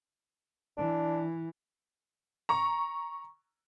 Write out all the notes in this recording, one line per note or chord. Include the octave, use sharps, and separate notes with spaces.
E3 D4
A#5 C#6